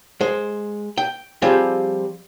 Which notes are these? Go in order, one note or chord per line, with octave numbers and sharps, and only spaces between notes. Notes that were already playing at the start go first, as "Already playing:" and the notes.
G#3 C5
G5
F3 G3 C4 F4 G4 G#4